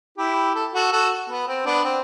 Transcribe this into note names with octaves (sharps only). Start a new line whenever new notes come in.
E4 G4
A4
F#4 A4
F#4 A4
B3
C4
B3 D4
C4